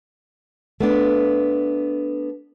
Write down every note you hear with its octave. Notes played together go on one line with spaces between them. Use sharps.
A3 B3 D4